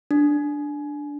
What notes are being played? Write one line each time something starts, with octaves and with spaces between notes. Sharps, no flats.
D4